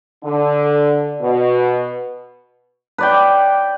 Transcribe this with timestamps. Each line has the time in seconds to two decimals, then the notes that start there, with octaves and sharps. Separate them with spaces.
0.24 D3
1.21 B2
2.98 B4 D5 G5